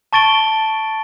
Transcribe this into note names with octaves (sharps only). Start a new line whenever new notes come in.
A5 C#6 A6 D7 G7